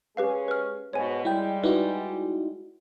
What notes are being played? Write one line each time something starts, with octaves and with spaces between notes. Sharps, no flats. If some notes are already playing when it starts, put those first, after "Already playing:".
G#3 C#4 G4 G#4 B4 F5
B4 F6
G#2 B2 G#3 C#5 G#5
G3 G#3 E4 G5
D#4 E4 F#4 B4